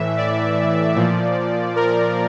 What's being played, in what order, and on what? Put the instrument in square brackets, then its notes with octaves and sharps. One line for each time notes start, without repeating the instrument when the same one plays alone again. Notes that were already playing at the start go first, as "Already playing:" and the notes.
Already playing: [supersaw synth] A2 E3 E5
D5
A#2 F3
A#4